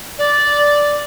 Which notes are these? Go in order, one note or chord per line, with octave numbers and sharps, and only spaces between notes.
D5